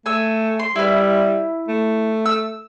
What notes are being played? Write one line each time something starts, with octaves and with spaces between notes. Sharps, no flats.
A3 G#5 E6
C6
G3 E4 B4
A3
E6